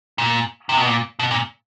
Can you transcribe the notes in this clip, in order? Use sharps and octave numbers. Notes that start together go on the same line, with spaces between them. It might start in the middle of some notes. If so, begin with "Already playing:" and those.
A#2
C3
B2
A#2
B2
A#2